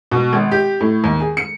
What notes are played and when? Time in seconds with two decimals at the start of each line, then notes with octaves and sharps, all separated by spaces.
0.12 B2
0.33 G#1
0.51 G4
0.81 A2
1.04 D#2
1.20 G#4
1.37 C#7